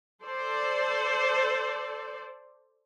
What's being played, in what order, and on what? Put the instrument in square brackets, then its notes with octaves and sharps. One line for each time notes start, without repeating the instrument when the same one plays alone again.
[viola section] A4 C5 D5